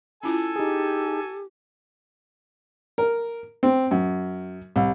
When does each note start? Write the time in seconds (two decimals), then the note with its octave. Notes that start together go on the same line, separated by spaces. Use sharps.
0.23 C#4 E4 F4 A4 G#5
0.56 D#4 G4 G#4
2.98 A#4
3.63 C4
3.91 F#2
4.76 C2